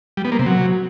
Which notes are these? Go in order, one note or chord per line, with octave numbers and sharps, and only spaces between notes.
G3
B3
A#3
C3
F#3